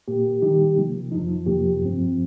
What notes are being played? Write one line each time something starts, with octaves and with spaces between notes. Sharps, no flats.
A#2 A#3 G4
D#3 G3 D#4 G4
C3 F3 A#3
F2 F3 D#4
F2 C3 F3 A#3 G4
G2 F3 C4